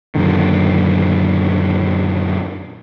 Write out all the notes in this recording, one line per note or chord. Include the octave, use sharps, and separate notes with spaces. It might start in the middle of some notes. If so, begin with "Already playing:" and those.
F#2 A#2 D3 D#3